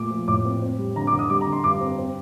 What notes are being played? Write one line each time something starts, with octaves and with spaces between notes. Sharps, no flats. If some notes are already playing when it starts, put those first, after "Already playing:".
Already playing: A#2 A3 D6
F3
A2 D6
C4
C4
G3
D3 A#5
D6
D3
D#6
G3 D6
A#5
D3
C6
G2 D6
C4
C4